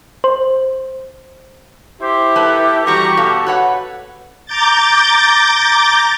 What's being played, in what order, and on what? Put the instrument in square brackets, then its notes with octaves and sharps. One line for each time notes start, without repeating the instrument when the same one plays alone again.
[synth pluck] C5
[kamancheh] E4 [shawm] G4 [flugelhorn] C5
[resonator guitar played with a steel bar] A#3 B4 A5 [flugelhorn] A4
[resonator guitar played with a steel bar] E3 G3 [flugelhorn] F#4 [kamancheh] A#5 C#6
[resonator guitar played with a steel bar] B2 F5 [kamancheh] A4
[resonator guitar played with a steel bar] F#4 C#5 F#5 [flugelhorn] B4
[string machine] A#5 D6 G6 A6